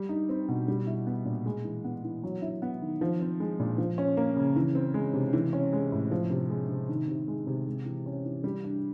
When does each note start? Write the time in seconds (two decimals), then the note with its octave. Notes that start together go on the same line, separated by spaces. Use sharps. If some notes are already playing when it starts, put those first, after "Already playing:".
Already playing: G3
0.09 D#4
0.29 C4
0.48 B2
0.68 G3
0.87 E4
1.07 B3
1.25 A#2
1.46 G#3
1.64 E3
1.84 B3
2.04 E3
2.23 F#3
2.42 E4
2.62 B3
2.81 D#3
3.01 F3
3.20 C4
3.40 G#3
3.59 A#2
3.78 F3
3.98 C#4
4.17 A#3
4.36 C#3
4.56 E3
4.75 C4
4.94 G#3
5.14 C3
5.33 E3
5.53 C#4
5.73 G#3
5.92 A2
6.11 F3
6.30 C3
6.50 G#3
6.69 C3
6.89 D#3
7.08 C3
7.28 G#3
7.47 C3
7.67 G#3
7.85 E3
8.06 C#4
8.25 E3
8.44 G3
8.64 D4